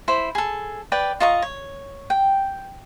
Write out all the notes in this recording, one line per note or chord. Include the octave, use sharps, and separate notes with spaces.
E4 C5 B5
G#4 A4
B4 D5 G5
F4 D#5 A#5 C#6
C#5
G5